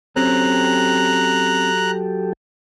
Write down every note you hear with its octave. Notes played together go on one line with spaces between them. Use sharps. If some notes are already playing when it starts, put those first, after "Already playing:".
F#3 C4 C#4 G4 A4 A#5 F#6